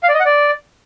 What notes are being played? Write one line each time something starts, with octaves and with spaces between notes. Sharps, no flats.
F5
D5
D#5
F#5
D5